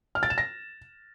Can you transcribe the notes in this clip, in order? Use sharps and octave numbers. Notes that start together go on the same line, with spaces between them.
F6
A6
E7
A#6